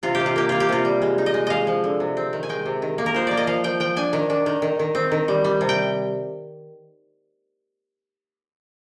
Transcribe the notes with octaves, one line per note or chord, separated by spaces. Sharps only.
C3 F4
G4
C3
F4
A#3 G4
A#3 F4
G4
C3 F4
G3
G#3
D#4
D#5
G#3
G#3 D#5 F5
F3
D3
C3
C4
D#3
G#5
G#3 G5
C3
D#3
A#3
A#4
F3 C5
A#3 D5
D#5
F3 F5
F3 G5
F3 G5
D4 G#5
D#3
D4
D#3
D#3
D#3
C4
D#3
G3
G3
C3
G5